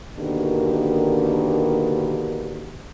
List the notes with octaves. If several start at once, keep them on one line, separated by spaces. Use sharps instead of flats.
B2 D3 D#3 A#3 D4 G4